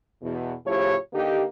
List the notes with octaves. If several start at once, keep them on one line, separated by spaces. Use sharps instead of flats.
E2 B2
A2 C#3 F3 E4 G4 C#5
D3 A#3 D#4 G4